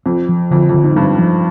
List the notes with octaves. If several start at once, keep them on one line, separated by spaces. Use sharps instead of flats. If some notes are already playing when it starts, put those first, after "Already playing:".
F2 C4
F3
F2 D3
F2
D3
G#2
G2 C4
F3